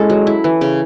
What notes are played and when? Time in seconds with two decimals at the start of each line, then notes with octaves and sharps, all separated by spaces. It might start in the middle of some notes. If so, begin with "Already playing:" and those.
Already playing: G#3 C#4 E4 A4
0.10 F#3
0.27 E4
0.44 E3
0.61 C#3